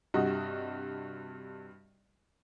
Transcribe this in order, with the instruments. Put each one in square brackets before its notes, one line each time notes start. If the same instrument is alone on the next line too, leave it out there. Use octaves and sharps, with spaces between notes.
[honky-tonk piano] G2 C3 F#4 D#5